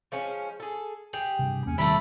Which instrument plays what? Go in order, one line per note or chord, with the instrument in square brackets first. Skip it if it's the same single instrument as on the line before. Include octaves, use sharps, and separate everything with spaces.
[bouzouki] F3 G#3 C#4
G#4 A4
[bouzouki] G4 G5 [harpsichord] G#4
[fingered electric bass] G2 C3
[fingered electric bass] E2 A#3 [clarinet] C#4
[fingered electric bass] D#1 D#3 G3 [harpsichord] C3 A3 [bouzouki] E4 A5 [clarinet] B5